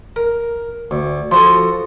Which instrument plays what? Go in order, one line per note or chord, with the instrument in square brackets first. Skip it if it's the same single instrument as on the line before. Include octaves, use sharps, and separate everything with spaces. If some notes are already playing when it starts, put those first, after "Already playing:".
[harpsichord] A#4
D2
[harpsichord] F3 F#4 A4 [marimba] C6